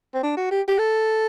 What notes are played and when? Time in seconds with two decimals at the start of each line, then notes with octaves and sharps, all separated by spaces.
0.14 C4
0.23 D4
0.37 F#4
0.51 G4
0.68 G4
0.78 A4